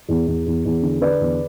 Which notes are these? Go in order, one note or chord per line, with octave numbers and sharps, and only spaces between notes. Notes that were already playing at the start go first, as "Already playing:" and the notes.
E2
E2
E2
E2
D3
D3 B4 D5
E2